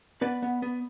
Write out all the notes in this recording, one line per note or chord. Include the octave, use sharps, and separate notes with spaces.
B3 B4 D5
B3
B3